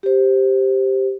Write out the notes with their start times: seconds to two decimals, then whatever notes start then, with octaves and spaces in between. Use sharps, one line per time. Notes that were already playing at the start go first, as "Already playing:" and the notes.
0.03 G4 C5